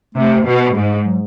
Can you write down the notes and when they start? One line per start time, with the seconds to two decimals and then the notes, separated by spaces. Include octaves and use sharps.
0.15 C3 A3
0.45 B2
0.75 G#2
1.05 F#3